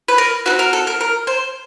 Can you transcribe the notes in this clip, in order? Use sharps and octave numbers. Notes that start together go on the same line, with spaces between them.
B4
A#4
C4 D#4 F#4 B4
A#4
A4
A#4
A#4
C5